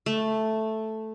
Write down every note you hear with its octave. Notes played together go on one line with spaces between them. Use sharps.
A3